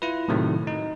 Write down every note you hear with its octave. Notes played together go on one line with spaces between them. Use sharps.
E4 F4 B4
A2 C3 D#3 F#3 A3
D#4